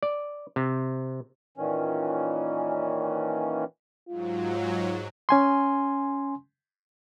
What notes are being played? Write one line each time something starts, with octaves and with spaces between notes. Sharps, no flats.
D5
C3
A#2 D#3 E3 C#4
G#2 F#3 F4
C#4 G#5 C6